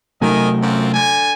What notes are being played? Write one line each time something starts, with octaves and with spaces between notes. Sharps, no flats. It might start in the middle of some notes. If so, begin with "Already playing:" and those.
C3 D#3 F#3 A3 D#5 G#5
F#2 C4 F4
D3 G#5